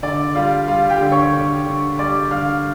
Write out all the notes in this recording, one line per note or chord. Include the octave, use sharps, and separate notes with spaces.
D3 D5
G3 F4 F5
G3 F4 F5
G4 G5
D3
C#5 C#6
D3
D3
G3 D5 D6
D3 F5 F6